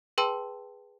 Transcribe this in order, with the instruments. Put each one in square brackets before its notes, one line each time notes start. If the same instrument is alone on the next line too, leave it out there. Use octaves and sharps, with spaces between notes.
[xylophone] G#4 B4 G5 A5 C6 E6